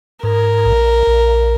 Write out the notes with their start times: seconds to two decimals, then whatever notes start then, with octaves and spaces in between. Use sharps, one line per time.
0.23 G#2 A#4
0.65 A#1
1.07 A#1